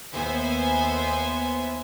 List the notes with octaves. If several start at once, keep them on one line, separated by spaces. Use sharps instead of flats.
D#2 B3 C5 E5 G#5